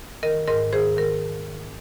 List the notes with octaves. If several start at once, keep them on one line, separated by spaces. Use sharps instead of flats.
D#3 A#4 D#5
G#2 A#4 D#5
D#3 G#4 C5
D#3 A#4